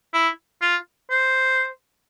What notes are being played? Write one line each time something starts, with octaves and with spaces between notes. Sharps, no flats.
E4
F4
C5